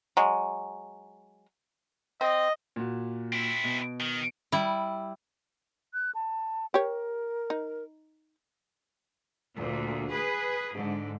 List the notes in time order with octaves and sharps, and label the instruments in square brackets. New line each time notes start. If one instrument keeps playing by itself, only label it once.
[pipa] F#3 G#3
[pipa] C4 [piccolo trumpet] D#5
[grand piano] A#2 F#4
[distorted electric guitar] C4 E4
[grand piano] B2
[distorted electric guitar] D#3
[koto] G3 E4
[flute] F#6
A5
[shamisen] G4 C#5 [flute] A#4
[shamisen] D#4
[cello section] D2 A#2
G#4 B4
G#2 D3